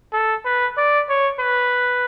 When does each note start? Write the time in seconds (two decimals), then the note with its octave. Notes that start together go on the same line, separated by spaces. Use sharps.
0.13 A4
0.45 B4
0.78 D5
1.09 C#5
1.40 B4